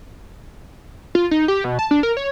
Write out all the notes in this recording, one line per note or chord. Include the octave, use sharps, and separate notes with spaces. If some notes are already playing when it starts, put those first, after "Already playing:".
F4
D#4
G4
B2
A5
D4
A#4
C#5